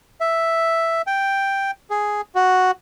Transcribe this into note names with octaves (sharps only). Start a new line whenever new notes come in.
E5
G5
G#4
F#4